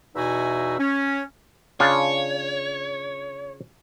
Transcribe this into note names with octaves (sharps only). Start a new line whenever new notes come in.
E2 B2 D#4 F#4 E5 G#5
C#4
C#3 D4 F4 C#5